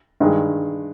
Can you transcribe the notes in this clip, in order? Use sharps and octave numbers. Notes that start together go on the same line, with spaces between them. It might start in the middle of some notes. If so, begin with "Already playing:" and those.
G2 D#3 G#3